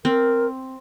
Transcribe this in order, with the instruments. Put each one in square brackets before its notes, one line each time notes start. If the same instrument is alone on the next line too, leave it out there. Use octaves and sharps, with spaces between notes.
[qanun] C4 [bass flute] A#4